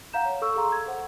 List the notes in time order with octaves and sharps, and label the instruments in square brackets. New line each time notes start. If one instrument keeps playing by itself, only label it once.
[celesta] F5 F#5 A#5 G6 E7
C#5
A4 C#6 E6
G#4 A4 F5 A#5 C6 E6
G#6
A4 C5 F#5